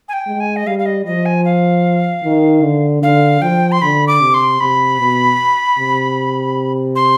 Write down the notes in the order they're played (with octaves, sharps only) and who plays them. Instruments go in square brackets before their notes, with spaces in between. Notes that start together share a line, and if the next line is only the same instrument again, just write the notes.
[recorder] G#5
G5
[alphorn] G#3
[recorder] G#5
D#5
[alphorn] G3 [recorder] F5
[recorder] F5
D#5
[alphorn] F3 [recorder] D#5
[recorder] G#5
F5
[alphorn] D#3
D3
[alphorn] D3 [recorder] F5
[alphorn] F3 [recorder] G5
[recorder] C6
[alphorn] D3 [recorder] B5
[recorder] D6
[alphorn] C3
[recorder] C6
[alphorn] C3 [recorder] B5
[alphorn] B2
C3
[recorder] C6